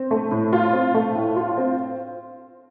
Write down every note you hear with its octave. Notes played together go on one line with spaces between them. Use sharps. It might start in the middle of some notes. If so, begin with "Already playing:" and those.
Already playing: C4
A3
A2
F4
C4
A3
A2
F4
C4